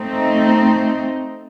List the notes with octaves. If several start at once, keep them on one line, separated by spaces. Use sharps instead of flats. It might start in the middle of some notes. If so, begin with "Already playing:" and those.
Already playing: A3 C4 D#4